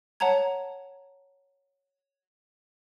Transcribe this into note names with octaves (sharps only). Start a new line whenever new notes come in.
C#5 F#5 A5 A#5 G#6